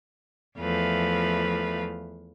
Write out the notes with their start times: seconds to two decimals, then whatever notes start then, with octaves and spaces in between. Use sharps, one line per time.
0.59 E2 F3 A3 B4 F5